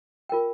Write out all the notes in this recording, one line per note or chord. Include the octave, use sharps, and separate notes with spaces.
F4 A#4 G5